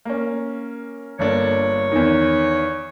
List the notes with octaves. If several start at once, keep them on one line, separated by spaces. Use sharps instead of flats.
A#3 C#4
G1 A#3 D4 C#5
E2 D#3